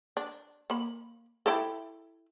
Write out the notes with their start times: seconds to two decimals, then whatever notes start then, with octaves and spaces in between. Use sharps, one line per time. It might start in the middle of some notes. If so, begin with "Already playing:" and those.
0.17 D4
0.70 A#3 B5
1.46 E4 G4 A4